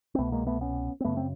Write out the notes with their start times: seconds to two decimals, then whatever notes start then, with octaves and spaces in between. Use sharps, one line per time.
0.15 C4
0.18 C2 B2 A3 B3
0.32 G#3 A#3
0.47 A3 B3
0.61 B3 C#4
1.01 C4
1.04 F#2 C#3 A3 B3
1.17 C4